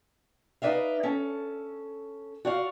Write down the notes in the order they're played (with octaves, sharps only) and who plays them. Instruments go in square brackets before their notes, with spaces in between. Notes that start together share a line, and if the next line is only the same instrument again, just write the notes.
[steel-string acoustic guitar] D#4 B4 D5 E5 F5
C#4 A4
F#4 D5 F5